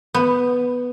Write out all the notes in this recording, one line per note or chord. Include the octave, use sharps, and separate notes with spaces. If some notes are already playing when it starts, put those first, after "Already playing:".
B3